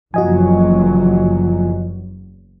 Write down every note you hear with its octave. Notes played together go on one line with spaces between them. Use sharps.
F#1 E2 F3 F#3 F#4 D#5 G#5